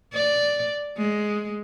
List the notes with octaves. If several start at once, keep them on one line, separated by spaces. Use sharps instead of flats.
D5
G#3